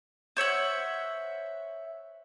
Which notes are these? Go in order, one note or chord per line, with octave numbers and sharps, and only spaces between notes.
C5 C#5 E5 F#5